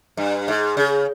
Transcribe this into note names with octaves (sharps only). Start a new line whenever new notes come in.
G2
G#2
C#3